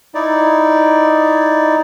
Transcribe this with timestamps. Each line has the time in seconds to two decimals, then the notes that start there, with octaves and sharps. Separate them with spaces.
0.15 D#4 E4 D5